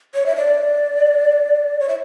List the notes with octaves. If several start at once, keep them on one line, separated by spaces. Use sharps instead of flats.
C#5
E5
D5
C#5
E5